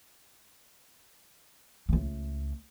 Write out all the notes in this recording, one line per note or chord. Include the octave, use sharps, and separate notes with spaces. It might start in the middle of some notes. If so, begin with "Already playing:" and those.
C#2 A3